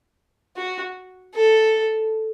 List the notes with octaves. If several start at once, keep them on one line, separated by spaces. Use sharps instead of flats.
F#4
A4